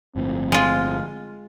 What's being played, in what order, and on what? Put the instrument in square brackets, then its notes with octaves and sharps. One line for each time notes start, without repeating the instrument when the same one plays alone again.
[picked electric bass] G1 A2 F3 [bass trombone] C4
[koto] G#3 F4